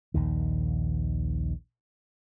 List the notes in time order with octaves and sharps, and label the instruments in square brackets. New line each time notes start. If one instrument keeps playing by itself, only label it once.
[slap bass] A#1 D#2 D#3